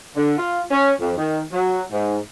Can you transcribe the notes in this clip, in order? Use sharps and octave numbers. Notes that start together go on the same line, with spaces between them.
D3
F4
C#4
F2
D#3
F#3
G#2